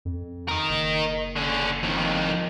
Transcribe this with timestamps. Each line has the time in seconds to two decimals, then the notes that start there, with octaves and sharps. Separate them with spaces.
0.05 F2
0.48 A#4 D#5
0.69 F#1
1.36 D3 C#4
1.83 F2 D#3